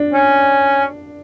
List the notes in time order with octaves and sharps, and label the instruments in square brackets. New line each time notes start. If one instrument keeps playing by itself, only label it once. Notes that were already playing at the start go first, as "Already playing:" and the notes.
Already playing: [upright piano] D4
[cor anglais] C#4